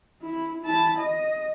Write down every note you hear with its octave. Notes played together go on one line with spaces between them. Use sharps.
E4
E4 A5
D#5